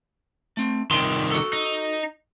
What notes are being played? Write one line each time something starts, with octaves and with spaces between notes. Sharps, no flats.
A3 C4
C2 D#3 G5 G#5 C6
F#4 A4
D#4